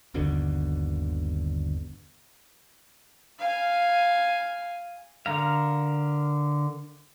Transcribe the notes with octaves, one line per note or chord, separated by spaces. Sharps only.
G1 D#2 B2 D3
F5 G#5
D3 A#4 F5